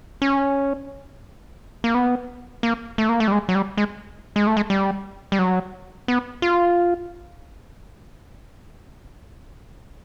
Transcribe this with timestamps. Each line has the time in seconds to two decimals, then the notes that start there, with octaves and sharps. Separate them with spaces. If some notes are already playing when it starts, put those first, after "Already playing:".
0.22 C#4
1.84 A#3
1.95 B3
2.63 A#3
2.98 A3
3.09 A#3
3.20 A3
3.28 G3
3.32 G#3
3.49 F#3
3.55 G3
3.77 G#3
4.36 G#3
4.47 A3
4.57 G#3
4.70 G3
5.32 G3
5.39 F#3
6.08 B3
6.42 F4